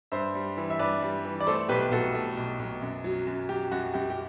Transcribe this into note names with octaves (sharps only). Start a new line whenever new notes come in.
G2 C5 E5
G3
E3
E5
G2 B4 D5
G3
E3
D5
A3 A4 C5
B1 G4 B4
B1 F#4 A4
A3
B1
B1
F#2
F#3
F#2
F#3 G4
F#2 F#4
F#2 G4
G4